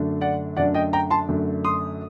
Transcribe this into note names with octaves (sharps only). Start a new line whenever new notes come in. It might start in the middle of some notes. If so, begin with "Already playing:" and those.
Already playing: F#2 D3 A3 D4
D5 F#5
F#2 D3 A3 D4 D5 F#5
D#5 G5
G5 A#5
A5 C6
F#2 D3 A3 D4
C6 D#6